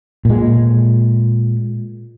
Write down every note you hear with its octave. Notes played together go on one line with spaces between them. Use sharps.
A#2 G#3